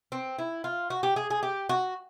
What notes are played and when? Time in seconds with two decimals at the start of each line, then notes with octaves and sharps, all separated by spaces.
0.12 C4
0.38 E4
0.64 F4
0.90 F#4
1.03 G4
1.16 G#4
1.30 G#4
1.43 G4
1.69 F#4